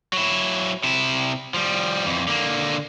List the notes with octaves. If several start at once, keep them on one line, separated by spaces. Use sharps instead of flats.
F#3 E4
C3 E4
F3 G3
F2 E3
D3 A#3